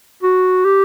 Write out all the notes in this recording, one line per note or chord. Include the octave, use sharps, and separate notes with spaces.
F#4
G4